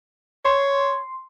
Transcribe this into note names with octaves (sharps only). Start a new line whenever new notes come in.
C#5 C6